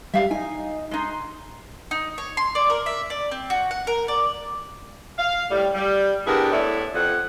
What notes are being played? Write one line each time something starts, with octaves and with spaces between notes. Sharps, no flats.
G3 E5 F5
D#4 G#5
G#3 D#4 C6
D#4
C#5
C6
D5
A#4
E5
D5
C4
F#4
F#5
A#4
D5
F5
A2 G3
G3
B3 D4 E4 G4 G#4 A#4
A2 A3 B3 E4 D5 E5
F2 F#5